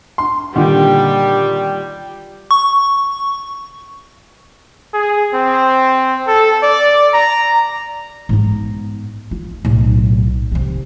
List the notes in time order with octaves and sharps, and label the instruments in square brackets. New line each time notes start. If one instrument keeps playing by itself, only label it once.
[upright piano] C6
[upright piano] A#2 D3 D#3 [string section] G3 G4
[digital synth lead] C#6
[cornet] G#4
C4
A4
D5
A#5
[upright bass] G#2 B3
F4
B1 A2
C3 D#3